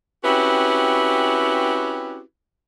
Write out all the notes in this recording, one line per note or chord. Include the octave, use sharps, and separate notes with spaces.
C4 C#4 E4 F#4 G4 B4